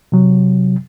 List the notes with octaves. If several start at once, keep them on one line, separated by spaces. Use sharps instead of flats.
C3 F#3